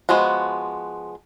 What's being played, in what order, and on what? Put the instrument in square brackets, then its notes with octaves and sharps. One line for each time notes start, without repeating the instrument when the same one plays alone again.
[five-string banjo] F3 G#3 B3 F#4